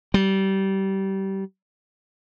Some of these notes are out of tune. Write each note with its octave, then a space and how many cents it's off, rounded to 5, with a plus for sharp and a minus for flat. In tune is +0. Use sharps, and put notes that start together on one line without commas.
G3 -25